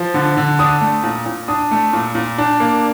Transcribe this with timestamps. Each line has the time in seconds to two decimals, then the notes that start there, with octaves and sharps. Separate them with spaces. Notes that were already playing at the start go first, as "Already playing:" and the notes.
Already playing: F3
0.14 D3
0.37 D3
0.59 D4 D#6
0.81 A3
1.03 A#2
1.26 A#2
1.48 D4 D#6
1.71 A3
1.93 A#2
2.15 A#2
2.38 D4
2.60 A#3